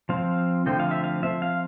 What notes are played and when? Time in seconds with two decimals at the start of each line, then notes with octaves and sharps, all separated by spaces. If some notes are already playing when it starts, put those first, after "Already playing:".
0.09 F3 C4 F5
0.66 D3 F3 A3 C4 G5
0.80 F5
0.91 E5
1.04 F5
1.22 F3 C4 E5
1.42 F5